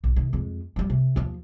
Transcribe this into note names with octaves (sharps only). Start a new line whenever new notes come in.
A#1
C3 D#3
F2 G#3
F3 G3
C3
D#2 F3